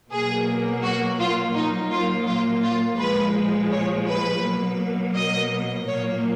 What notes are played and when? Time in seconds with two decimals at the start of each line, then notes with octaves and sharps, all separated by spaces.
0.10 B2 F#3 A#3 G#4
0.83 F#4
1.19 F4
1.54 A#2 F#3 A#3 D#4
1.91 F4
2.26 F4
2.63 F4
2.99 A#2 F3 G#3 B4
3.71 C#5
4.07 B4
4.43 B2 F#3 A#3
5.15 D#5
5.87 A#2 F#3 A#3 C#5